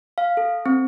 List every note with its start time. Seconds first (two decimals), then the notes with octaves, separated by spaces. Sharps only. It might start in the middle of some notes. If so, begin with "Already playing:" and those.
0.18 F5
0.37 A4
0.66 C4